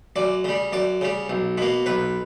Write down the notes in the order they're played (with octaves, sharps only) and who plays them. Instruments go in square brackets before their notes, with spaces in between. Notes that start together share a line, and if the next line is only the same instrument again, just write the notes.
[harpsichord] F#2 D5
C#3 G3
F#2 D5
C#3 G3
B1
B2 A#3
B1 B4